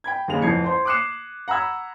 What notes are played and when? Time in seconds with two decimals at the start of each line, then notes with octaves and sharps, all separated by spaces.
0.04 G5 B5 G#6
0.28 D#2 C#3 F7
0.42 A1 F2 E3 G#6 C7 C#7
0.64 C5 C6
0.85 D6 D#6 F#6 C7 C#7 E7
1.48 F#5 A#5 B5 E6 G#6